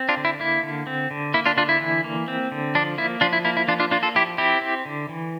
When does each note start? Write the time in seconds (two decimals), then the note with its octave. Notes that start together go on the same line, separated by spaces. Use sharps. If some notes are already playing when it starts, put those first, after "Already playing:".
Already playing: C4
0.09 D4 F4
0.17 D3
0.25 E4
0.40 A#3 E4
0.63 D3
0.87 C4
1.11 D3
1.34 A#3 E4
1.46 D4 F4
1.57 D3 D4 F4
1.69 E4
1.80 E3
2.04 A#3
2.28 C4
2.52 D3
2.75 F3 D4
2.98 A#3 E4
3.21 F3 D4 F4
3.33 E4
3.45 A#3 E4
3.57 E4
3.68 F3 D4 F4
3.80 D4 F4
3.91 A#3 D4 F4
4.03 F4 A4
4.15 F3 E4 G4
4.38 C4 E4 G4
4.61 C4
4.85 D3
5.09 E3